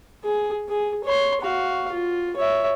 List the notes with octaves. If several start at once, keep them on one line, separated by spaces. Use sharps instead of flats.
G#4
G#4
C#5 C6
F#4 F5
F4
C#5 E5